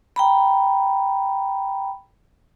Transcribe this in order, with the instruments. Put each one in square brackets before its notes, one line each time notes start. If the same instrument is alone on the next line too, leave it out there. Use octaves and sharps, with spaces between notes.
[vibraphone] G5 A#5 B5